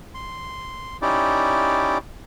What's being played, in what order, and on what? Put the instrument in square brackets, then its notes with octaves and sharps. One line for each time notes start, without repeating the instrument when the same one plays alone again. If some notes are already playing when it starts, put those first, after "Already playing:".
[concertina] C6
C#4 D#4 E4 G4 D5